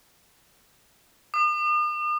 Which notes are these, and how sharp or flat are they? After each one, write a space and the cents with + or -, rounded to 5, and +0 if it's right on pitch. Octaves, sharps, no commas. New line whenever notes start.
D#6 -45